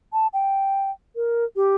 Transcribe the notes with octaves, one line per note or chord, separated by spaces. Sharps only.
A5
G5
A#4
G4